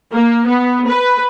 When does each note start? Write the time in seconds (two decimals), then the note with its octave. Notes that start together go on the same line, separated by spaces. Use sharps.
0.12 A#3
0.47 B3
0.87 B4